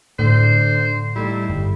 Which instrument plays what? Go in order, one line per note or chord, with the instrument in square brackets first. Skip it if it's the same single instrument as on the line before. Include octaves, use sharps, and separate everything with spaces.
[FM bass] A2 [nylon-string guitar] D3 [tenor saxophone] C5
[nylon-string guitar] G3 A3 D#4 [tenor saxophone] E4
[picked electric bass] G1 [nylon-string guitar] G3